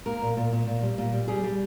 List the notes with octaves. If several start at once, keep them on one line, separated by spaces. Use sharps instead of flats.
A#3 A#4
A#2
A#2
A#2
A#2
G3
A#2
G3
G3 G#4
G3